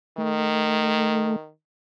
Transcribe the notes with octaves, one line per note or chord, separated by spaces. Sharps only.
D#3 A3